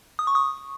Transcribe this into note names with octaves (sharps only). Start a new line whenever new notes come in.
D#6
C#6
D#6